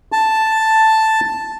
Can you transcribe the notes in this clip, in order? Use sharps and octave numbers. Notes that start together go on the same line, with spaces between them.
A5